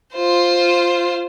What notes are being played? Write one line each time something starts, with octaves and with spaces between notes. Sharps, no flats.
F4 C5